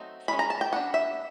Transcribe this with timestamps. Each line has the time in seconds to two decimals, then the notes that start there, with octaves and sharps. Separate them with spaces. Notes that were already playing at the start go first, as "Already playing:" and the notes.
Already playing: F#3 A3 C4 D#4
0.28 E3 G#3 C#4 B5
0.39 A#5
0.50 A5
0.61 G5
0.72 G3 B3 D4 F#5
0.94 E5